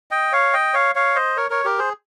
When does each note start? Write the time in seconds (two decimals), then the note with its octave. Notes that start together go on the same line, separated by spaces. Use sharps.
0.11 D#5 G5
0.33 C#5 F5
0.53 D#5 G5
0.74 C#5 F5
0.95 C#5 F5
1.15 C5 D#5
1.37 A#4 C#5
1.50 A#4 C#5
1.65 G4 A#4
1.78 G#4 C5